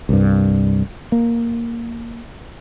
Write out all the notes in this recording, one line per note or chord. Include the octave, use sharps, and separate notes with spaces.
C2 G2
A#3